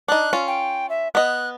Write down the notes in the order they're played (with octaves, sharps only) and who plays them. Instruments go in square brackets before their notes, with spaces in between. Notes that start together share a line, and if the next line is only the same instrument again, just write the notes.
[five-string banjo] D4 D#4 [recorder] F#6
[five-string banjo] C#4 F4
[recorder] G5
E5
[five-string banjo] B3 D#5 [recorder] F#6